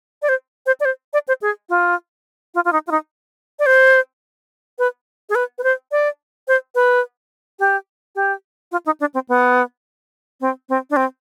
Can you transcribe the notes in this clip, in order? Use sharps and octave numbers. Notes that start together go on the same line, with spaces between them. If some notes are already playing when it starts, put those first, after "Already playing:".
D5
C5
C5
D5
C5
D5
C5
G#4
F4
F4
F4
D#4
F4
D#4
D5
C5
B4
G#4
B4
B4
C5
D5
C5
B4
G4
G4
F4
D#4
D4
C4
B3
C4
C4
D4
C4